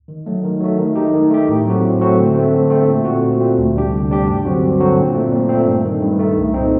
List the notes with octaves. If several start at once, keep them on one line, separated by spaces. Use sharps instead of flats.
D#3
F#3 A3
D#3
F#3 A3
D#3
A3 D#4 G4
D#3
A3 D#4 G4
A2
F#3 A3 C4 F#4
A2
F#3 A3 C4 F#4
D3
A3 C4
D3
A3 C4
A#2
A3 C4 F#4
A#2
A3 C4 F#4
D2
C3 G3 D4 G4
D2
C3 G3 D4 G4
G2
D3 F#3 C4 F#4
G2
D3 F#3 C4 F#4
A#2
A3 C4
A#2
A3 C4
G2
D#3 A3
G2
D#3 A3
C2
A#2 A3 C4 D#4